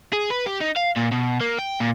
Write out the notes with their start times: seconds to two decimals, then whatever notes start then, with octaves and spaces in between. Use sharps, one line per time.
0.13 G#4
0.30 B4
0.46 G4
0.60 D#4
0.76 F5
0.96 A#2
1.11 B2
1.41 A#3
1.59 G5
1.80 A#2